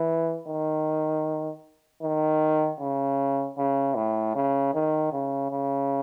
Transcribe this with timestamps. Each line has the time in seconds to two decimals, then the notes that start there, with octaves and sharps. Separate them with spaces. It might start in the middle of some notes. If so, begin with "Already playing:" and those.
Already playing: E3
0.48 D#3
2.03 D#3
2.80 C#3
3.58 C#3
3.96 A2
4.35 C#3
4.74 D#3
5.13 C#3
5.51 C#3